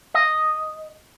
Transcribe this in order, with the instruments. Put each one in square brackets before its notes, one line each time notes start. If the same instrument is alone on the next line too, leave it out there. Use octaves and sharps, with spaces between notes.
[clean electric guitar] D#5